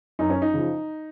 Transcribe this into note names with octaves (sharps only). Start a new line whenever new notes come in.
F#2 D#4
C#4
D#4
C#3 F3